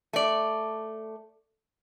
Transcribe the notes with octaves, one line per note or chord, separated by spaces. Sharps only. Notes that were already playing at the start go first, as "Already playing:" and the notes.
A3 D5